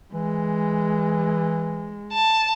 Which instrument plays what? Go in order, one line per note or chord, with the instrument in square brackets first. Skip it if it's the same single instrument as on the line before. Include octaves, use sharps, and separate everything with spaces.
[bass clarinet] E3 [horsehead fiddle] G#3
[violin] A5